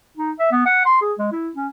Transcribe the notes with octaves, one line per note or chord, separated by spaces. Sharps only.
D#4
E5
B3
F#5
C6
G#4
G#3
E4
C#4